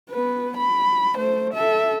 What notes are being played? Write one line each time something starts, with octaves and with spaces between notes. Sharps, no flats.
B3 B4
B5
A3 C5
A4 E5